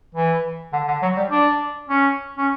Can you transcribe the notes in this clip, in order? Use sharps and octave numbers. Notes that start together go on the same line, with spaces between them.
E3
D3
D3
F#3
G3
D4
C#4
C#4